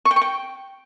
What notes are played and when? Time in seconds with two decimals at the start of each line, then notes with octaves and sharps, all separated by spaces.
0.05 C#6
0.11 G5
0.16 C#6
0.22 G5